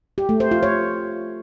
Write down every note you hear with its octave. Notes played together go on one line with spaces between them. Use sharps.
G4
A3
C5
F4
C#5